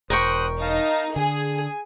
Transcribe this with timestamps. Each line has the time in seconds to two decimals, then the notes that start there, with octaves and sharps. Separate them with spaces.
0.10 E1 A#4 C5 G5 C#6 D#6 F#6
0.61 D#4 F5 A5
1.16 D3 G#4 G#5